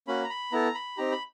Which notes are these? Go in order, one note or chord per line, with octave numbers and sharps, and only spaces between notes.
A#3 C#4 F#4 B5
A#5
B5
B3 E4 A4 A#5
B5
C4 D#4 G4 A#5
B5